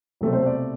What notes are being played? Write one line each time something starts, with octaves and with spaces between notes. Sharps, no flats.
C2 B2 A3 C4
C5
D5